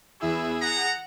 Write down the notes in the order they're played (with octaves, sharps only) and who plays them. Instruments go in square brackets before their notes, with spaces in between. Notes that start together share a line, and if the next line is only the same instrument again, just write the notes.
[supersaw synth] E2 E4 E6 [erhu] G#4
[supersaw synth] F#5 [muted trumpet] A#5